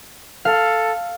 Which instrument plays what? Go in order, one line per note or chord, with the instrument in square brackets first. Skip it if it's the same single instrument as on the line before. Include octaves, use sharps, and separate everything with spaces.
[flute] A4 [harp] F5